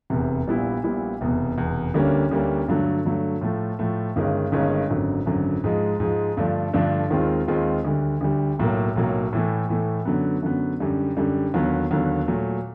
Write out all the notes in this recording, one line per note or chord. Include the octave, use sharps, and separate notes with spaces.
F1 E2 C3
A#1 A#2 G3 B3 E4
A#1 A#2 G3 B3 E4
F1 E2 B2
F1 E2 B2
D2 D3 G3 A#3 C#4
D2 D3 G3 A#3 C#4
G2 D3 F#3 A3
G2 D3 F#3 A3
A2 F3 A3
A2 F3 A3
G1 G2 D#3 G#3 C#4
G1 G2 D#3 G#3 C#4
G#1 F#2 D3 F#3
G#1 F#2 D3 F#3
G#2 F3 G#3
G#2 F3 G#3
G2 D3 F3 A3 D4
G2 D3 F3 A3 D4
D#2 D#3 G#3 C4 F4
D#2 D#3 G#3 C4 F4
D2 D3 G3
D2 D3 G3
B1 A2 F#3 A#3
B1 A2 F#3 A#3
A2 E3 A3
A2 E3 A3
F#2 D3 F#3 B3
F#2 D3 F#3 B3
F#2 D3 G3
F#2 D3 G3
D#2 D3 F#3 B3
D#2 D3 F#3 B3
A#2 F#3 A3